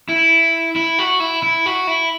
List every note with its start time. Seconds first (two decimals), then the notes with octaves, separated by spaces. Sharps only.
0.09 E4
0.76 E4
0.99 F#4
1.20 E4
1.43 E4
1.66 F#4
1.87 E4